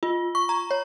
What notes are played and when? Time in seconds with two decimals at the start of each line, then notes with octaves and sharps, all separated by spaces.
0.03 F4
0.35 C#6
0.49 A#5
0.71 C#5